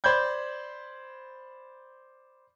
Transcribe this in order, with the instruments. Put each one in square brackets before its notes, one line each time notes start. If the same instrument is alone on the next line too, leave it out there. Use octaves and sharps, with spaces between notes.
[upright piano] C5 D5 B5 G6 G#6